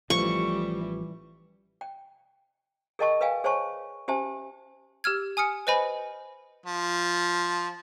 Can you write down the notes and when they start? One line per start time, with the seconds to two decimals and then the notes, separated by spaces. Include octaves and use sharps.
0.10 A1 A2 E3 F3 G3 C#6
1.81 G5
2.99 G#4 A#4 D#5 G5 A5 C#6
3.21 B4 E5 F5 G5 G#5
3.44 G#4 C5 C#5 G#5 A5 C#6
4.08 C#4 G4 C5 E5 G#5 A5
5.04 G4 E6 F6 G#6
5.37 G#5 D#6 F6 C#7
5.67 B4 C5 D#5 G#5 B5
6.66 F3